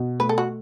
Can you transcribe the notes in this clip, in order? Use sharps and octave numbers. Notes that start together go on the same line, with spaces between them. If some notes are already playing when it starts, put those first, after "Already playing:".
Already playing: B2
A3 B4
A4
F#4